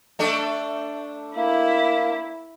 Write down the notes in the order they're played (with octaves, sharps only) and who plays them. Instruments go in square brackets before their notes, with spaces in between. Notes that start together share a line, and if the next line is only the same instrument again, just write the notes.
[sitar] A3 D4 A4
[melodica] A#3 [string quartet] E4